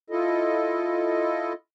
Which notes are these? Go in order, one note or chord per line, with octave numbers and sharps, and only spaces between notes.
E4 F4 A4 D#5